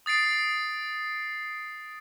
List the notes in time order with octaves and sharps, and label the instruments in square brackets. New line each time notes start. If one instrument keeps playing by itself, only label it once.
[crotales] D#6 A6 C7 D7